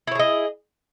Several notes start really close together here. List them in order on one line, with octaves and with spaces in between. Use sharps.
E4 C#5 G#4 D#5